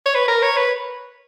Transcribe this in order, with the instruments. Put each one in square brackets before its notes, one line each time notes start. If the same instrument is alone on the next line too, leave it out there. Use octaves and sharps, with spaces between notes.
[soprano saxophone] C#5
B4
A#4
C#5
B4